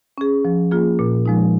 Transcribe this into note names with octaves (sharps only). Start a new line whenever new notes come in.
C#4 G#4
F3
A#3 F4 G#4
A#2
F3 G#3 D#4